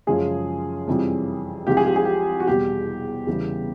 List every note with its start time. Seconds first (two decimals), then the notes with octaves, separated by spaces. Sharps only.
0.07 F#2 C#3 F3 G#3 G#4
0.87 F2 C3 E3 G3
1.67 C2 C3 F3 G#3 G4
1.77 G#4
1.86 G4
1.96 G#4
2.05 G4
2.40 F#4
2.47 E2 B2 G3 G4
3.27 E2 C#3 E3 G3